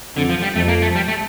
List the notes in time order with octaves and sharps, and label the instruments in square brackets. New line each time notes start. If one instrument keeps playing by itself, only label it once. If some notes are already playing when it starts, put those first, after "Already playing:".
[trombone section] F2 [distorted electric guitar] D3
[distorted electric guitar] F3
G3
[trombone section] F2 [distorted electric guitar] A3
[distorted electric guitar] A#3
A3
G3
A3